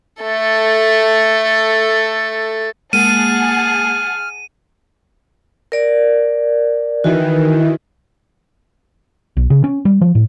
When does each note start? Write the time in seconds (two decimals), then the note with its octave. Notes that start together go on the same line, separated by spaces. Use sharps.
0.22 A3 A4
2.93 G#3 A#3 G#4 F#5 A5 F6 D#7
5.72 A#4 D5
7.04 D#3 E3 F#4
9.37 B1
9.50 C#3
9.64 C#4
9.85 G3
10.01 F3
10.15 A2